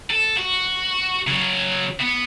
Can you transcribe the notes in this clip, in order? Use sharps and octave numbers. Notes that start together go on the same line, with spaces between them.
A4
F#4
C#3 F#3
B3